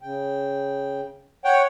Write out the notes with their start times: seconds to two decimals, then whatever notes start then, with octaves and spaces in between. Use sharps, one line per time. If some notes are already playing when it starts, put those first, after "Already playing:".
0.01 C#3 G5
1.44 C#5 F#5 G5